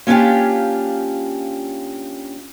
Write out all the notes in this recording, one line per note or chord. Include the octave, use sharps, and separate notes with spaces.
A#3 C#4 D4 F4 G4